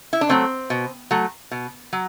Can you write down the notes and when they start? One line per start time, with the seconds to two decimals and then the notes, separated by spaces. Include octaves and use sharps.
0.13 E4
0.21 D4
0.29 F#3 A3 C4
0.70 B2
1.11 F#3 A3
1.51 B2
1.93 F#3